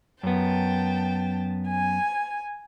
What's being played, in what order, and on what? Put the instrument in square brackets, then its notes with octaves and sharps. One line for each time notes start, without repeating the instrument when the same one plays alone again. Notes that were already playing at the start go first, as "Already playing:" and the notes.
[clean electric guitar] F#2 B3 [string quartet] G5 A5
[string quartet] G#5